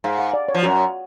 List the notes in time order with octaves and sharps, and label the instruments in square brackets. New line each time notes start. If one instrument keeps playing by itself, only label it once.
[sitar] G#2 [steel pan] F5
[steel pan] F5
D5
C#5
[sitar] F3
[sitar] F#2 [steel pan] F#4